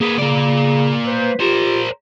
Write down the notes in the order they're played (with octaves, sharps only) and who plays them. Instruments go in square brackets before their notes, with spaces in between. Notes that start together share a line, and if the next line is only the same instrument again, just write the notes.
[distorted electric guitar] A#3 B4 [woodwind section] G#4
[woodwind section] C#3 [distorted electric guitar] A#3 D5
[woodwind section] B4 C5
[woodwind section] F4 G4 [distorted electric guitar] A#4 C5